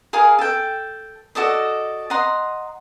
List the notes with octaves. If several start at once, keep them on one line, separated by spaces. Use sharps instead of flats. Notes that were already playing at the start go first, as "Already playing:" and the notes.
G#4 A#4 F5 G#5
A4 G5
F#4 A4 D5 D#5
D#5 F#5 A#5 C6